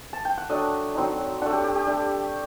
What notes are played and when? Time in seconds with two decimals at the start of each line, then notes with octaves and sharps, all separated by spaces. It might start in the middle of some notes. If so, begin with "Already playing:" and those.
0.13 A5
0.25 G5
0.38 F#5
0.50 F#3 A3 D4 D#5
0.95 F#3 C4 D#4
1.41 A3 D4 F#5
1.52 G4
1.64 G4
1.75 G4
1.87 A3 D4